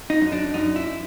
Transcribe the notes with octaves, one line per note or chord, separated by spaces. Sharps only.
D#4
F#2
D4
F#2 D#4
E4